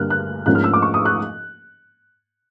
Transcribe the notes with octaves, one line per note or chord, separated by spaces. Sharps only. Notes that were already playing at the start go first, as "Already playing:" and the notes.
Already playing: G2 D3 G3 A#3 F6 F#6
F#6
G#2 F3 A#3 C#4 F#6
F6
E6
D6
C#6
D#6
F#6